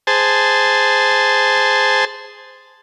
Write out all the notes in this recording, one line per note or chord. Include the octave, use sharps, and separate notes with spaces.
G#4 C5 A5